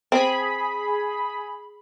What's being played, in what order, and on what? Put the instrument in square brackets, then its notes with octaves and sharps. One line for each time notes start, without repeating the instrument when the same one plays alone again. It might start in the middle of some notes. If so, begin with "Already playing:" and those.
[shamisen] C4 [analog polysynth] G#4 B5